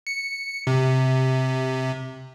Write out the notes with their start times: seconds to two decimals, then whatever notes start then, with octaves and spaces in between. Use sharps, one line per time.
0.07 C#7
0.67 C3